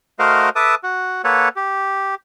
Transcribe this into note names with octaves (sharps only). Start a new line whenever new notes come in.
A3 F#4 A#4 C5 D#5 F5
A4 B4 E5 A5 D6 D#6
F#4
A#3 A4 B4 C#5 F#5
G4